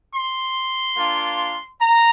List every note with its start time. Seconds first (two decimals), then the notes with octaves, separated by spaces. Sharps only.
0.13 C6
0.96 A#3 D4 F4
1.80 A#5